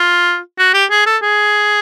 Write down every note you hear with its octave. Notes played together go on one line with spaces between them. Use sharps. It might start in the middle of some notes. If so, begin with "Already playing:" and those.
Already playing: F4
F#4
G4
G#4
A4
G#4